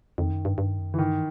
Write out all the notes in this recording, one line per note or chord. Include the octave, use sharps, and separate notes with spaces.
F2 D#3
F#2
G2
G2
F#2
E3
G2 D#3